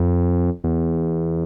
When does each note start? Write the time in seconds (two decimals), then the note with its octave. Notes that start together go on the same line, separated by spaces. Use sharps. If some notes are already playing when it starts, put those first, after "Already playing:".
Already playing: F2
0.64 E2